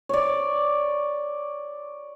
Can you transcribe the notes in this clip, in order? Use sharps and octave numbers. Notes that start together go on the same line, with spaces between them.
C#5 D5